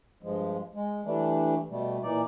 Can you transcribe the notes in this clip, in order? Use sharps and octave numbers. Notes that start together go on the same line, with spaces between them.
G2 F3 G#3
G#3
E3 G3 A3 D4
B2 G3 A3
A#2 E3 D#4 D5